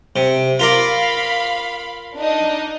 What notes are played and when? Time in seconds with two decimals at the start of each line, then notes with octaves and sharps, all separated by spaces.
0.16 C3
0.59 F4 A#4 D5 F5 B5
2.18 D4 D#4 D#5